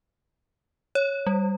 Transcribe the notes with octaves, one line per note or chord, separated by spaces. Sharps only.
C#5
G3